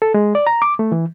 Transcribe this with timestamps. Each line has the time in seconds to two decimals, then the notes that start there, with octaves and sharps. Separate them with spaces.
0.02 A4
0.14 G#3
0.35 D5
0.47 A#5
0.62 D6
0.79 A3
0.92 E3